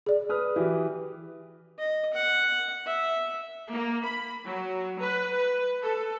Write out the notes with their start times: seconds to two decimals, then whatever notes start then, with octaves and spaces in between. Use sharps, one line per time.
0.06 G#4 D5
0.29 B4 D#6 F6
0.56 E3 F#4 G4
1.79 D#5
2.14 F#5
2.86 E5
3.72 A#3
4.05 B5
4.47 F#3
4.99 B4
5.35 B4
5.83 A4